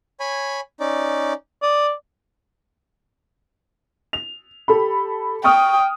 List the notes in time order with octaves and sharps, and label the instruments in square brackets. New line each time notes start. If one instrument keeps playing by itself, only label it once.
[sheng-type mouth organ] C#5 G#5 B5
C#4 D#4 D5
[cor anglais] D5 [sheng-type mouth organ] D#6
[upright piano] F7
G4 A4 B5
[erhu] G5 [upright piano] C#6 D#6 F6